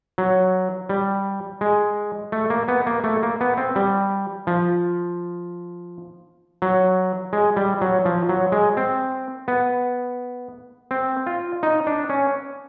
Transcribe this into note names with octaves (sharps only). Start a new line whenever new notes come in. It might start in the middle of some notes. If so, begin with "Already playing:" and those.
F#3
G3
G#3
A3
A#3
B3
A#3
A3
A#3
B3
C4
G3
F3
F#3
G#3
G3
F#3
F3
F#3
G#3
C4
B3
C4
F4
D#4
D4
C#4